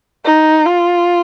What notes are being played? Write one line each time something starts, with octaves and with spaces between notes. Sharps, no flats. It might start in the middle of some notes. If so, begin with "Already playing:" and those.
D#4
F4